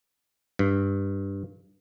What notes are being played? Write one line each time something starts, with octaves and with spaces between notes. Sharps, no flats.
G2